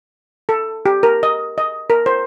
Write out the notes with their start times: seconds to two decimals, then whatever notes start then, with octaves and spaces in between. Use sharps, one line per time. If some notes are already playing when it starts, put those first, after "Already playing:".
0.49 A4
0.86 G4
1.03 A#4
1.23 D#5
1.58 D#5
1.90 A#4
2.06 C5